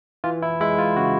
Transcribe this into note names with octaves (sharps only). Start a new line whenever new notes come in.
E3 F4
E4
G#3 E4
F4
C#3 F#4